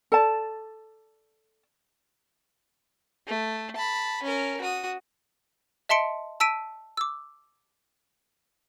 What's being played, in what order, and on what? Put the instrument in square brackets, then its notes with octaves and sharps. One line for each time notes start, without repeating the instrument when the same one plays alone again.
[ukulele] A4 D5 A5
[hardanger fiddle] A3
A5 B5
C#4 A#4
F#4 D#6
[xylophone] D#5 E5 A5 C6 C#7 D7
A5 E6 B6 D7 D#7
D6 E6